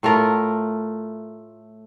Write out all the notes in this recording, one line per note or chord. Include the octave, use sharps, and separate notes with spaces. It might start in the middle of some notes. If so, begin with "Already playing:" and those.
A2 A3 F4 A#4